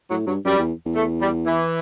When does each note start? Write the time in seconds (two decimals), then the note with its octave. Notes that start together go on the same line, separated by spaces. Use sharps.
0.10 A2 F#3
0.27 G2 F#3
0.44 F#2 G3
0.58 E2
0.86 E2
0.95 A3
1.21 G3
1.46 E3